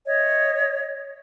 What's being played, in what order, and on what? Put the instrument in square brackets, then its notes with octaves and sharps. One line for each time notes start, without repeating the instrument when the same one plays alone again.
[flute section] C#5 D#5 E5